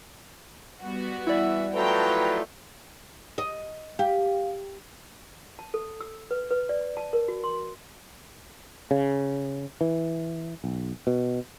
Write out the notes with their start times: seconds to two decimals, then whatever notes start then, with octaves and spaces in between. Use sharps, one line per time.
0.83 G3 B3 F#4
1.27 E3 E4 D5 E5
1.74 F3 F#3 A3 A4 B4 G5 A#5
3.38 D#5
3.99 G4 F5
5.59 A5
5.74 A4
6.01 E6
6.31 B4
6.51 B4
6.69 D5
6.97 A5
7.13 A#4
7.28 F#4
7.44 C6
8.91 C#3
9.81 E3
10.64 B1
11.07 B2